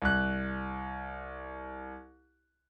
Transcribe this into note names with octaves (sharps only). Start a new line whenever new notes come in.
C2 F#6